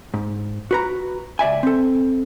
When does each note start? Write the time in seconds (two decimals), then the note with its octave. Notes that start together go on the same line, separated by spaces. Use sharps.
0.14 G#2
0.71 F#4 B4 A#5
1.39 C#2 D5 E5 G#5
1.63 C4 A4